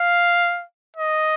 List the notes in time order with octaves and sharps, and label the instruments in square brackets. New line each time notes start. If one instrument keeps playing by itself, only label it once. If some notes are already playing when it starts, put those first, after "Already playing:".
Already playing: [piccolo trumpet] F5
D#5